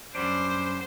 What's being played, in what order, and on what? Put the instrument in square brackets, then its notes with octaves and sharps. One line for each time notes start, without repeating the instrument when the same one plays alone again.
[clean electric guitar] F#2 G3 D4 [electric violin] C5